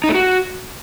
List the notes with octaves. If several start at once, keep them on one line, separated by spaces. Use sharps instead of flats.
D#4
A3
F#4